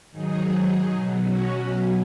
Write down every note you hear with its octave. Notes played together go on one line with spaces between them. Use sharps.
G#2 D#3 F#3 D#4 G#4
B2 F#3
C#4 F#4
B2 F#3